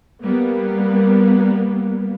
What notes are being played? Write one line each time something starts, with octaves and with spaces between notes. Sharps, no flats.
G3 A#3 B3